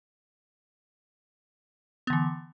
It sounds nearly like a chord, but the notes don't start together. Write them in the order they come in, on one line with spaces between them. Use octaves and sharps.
B3 D3 E3